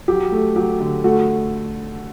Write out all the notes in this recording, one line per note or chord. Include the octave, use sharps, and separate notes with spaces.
F#3 G4
A3
F#3 G4
D3
A3 F#4